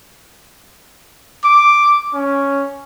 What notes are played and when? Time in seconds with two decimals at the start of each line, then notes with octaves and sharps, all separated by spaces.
1.44 D6
2.14 C#4